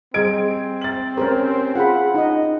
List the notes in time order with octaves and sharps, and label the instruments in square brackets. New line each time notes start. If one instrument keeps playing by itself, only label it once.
[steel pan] G3 G#4 D#5 [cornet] C4 [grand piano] G#6 D7
[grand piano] A6 F#7
[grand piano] C#4 G4 [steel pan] A#4 C5 A#5
[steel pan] F4 G#4 B5 [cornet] F#5
[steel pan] D#4 D#5